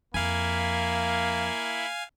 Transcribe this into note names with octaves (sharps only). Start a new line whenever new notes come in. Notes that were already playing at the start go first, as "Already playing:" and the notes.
F2 A#3 E4 E5 F5 G#5